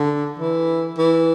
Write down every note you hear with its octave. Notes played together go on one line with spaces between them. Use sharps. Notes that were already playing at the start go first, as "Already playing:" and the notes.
Already playing: D3
E3
E3